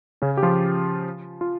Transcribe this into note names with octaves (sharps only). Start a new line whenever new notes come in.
C#3 C#4
G4
F3 F4
F4